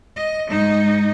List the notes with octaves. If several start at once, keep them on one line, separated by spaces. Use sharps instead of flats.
D#5
G#2 D#4